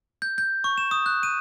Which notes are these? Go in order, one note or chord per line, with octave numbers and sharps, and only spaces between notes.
G6
G6
C#6
E7
D#6
F#6
D#7